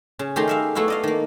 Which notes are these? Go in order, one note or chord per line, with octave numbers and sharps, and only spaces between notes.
C#3
D#3 A3 G4 G#4 A#5 C6
A#4 E5 F5
A3 B3 E4 F#4 F5
D5 D#5 F5
D#3 A#3